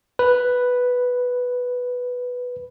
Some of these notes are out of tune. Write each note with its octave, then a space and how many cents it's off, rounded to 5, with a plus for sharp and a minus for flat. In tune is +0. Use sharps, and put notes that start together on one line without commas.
B4 +0